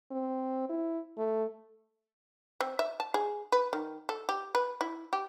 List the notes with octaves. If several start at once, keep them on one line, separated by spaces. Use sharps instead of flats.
C4
E4
A3
C4
E5
A5
G#4
B4
D#3
A4
G4
B4
E4
G4